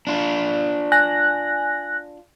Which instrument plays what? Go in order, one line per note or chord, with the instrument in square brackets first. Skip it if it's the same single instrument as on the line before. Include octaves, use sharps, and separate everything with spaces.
[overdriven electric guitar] D4 F4
[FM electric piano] G#5 F#6 A#6